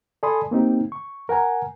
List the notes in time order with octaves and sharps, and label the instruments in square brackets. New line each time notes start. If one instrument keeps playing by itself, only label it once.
[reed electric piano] A4 D5 G#5 B5 C6 D#6
A#3 C4 D#4 G4
C#6
A#4 F#5 G#5 A#5